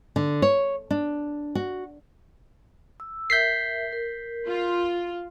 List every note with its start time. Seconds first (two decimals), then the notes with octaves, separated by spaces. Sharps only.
0.16 D3
0.42 C#5
0.91 D4
1.55 F#4
3.00 E6
3.30 A#4 E5 G6 B6 C7
3.93 A#4
4.46 F4